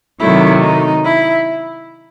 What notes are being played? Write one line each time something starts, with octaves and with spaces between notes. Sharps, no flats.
C3 D#3 F#3 A3 E4
D#4
E4